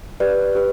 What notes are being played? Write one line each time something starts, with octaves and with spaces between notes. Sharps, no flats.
G4 B4 D5
G4 B4